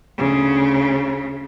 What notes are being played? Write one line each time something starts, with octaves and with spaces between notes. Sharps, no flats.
D2 C#3